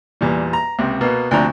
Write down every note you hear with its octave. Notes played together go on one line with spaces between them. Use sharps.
E2 A#2 G3
A#5
C#2 C3
B2 A#3 B3
D2 C3 F3 D4 A#5